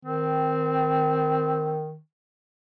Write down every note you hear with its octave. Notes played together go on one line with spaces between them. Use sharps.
D#3 C4